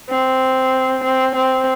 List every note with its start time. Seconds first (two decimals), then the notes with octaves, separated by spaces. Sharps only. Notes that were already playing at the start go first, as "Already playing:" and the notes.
0.10 C4
1.04 C4
1.35 C4